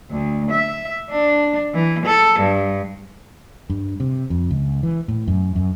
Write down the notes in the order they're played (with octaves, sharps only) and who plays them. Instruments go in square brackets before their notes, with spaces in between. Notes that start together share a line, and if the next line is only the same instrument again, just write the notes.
[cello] D2
E5
D4
E3
A4
G2
[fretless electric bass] G2
C3
F2
C#2
E3
A2
F#2
F#2